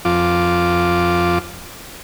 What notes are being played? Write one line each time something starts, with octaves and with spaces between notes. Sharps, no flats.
F2 F4 D6